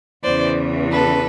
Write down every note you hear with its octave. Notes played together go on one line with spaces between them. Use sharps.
E2 C#3 E3 C5 D5
A4 B4